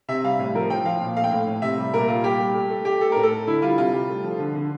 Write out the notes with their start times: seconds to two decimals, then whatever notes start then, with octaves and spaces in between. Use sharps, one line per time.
0.08 C3 E5
0.24 G3 F5
0.39 A2
0.54 F3 A#4
0.70 F3 G5
0.85 F3 F5
1.01 A#2
1.16 A3 F5
1.24 G5
1.31 A2 F5
1.47 A2
1.62 C3 E5
1.78 G3
1.94 A#2 A#4
2.08 G3 F4
2.24 G3 G4
2.40 G3
2.54 A3
2.70 A3
2.85 A3 G4
3.01 A3 A4
3.12 A2 A#4
3.23 A4
3.31 A3
3.47 D3 E4
3.62 G3 F4
3.78 C3 F4
3.93 G3
4.09 A3
4.24 F3
4.39 D3
4.55 D3